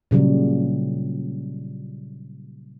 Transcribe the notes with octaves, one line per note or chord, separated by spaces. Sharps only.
A#2 C#3 F#3 G3